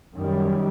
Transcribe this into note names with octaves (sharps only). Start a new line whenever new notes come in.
F#2 D#3 G3